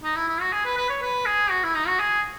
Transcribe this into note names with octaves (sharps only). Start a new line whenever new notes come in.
D#4
E4
E4
F#4
G#4
B4
B4
C#5
B4
G#4
F#4
E4
D#4
F#4
G#4